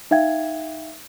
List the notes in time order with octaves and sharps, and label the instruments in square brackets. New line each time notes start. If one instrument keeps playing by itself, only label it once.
[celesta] D#4 E5 F5 G5 G#6